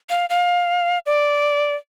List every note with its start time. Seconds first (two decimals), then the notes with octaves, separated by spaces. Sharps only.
0.10 F5
0.30 F5
1.06 D5